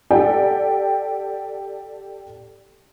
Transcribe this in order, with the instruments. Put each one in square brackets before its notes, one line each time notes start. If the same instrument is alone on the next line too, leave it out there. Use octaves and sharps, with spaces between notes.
[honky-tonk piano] G4 A4 D5 F#5 G5